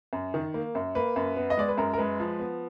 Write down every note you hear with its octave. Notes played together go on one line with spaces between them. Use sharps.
F#2
D#3
A#3
F#2
A#3 B4
F#2
B3
D#5
G#3 D5
B4
F#2 A#4
A#4
G#3 B4
F3
B3